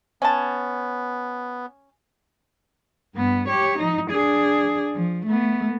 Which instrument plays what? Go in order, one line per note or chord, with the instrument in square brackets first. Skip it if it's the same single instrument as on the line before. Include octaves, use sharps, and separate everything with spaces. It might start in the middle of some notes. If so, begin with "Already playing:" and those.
[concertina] B3 [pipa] C#4 A5
[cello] G2 B3
G4 C#5
F3 D#4
D4 G#4
F3
A3 B3